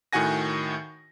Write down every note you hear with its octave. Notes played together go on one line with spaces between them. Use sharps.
A2 D#3 F#4 F#5 G#5 A#6